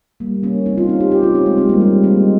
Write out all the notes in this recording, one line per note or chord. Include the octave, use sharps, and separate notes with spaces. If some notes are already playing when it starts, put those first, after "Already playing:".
G3 A#3
A#3 C#4
C4 D#4
C#4 F4
C4 D#4
D#4 G4
D#4 G4
C#4 F4
C4 D#4
G#3 C4
G#3 C4
G3 A#3
G#3
G#3 C4